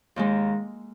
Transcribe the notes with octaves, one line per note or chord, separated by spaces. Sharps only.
D#2 D#3 G#3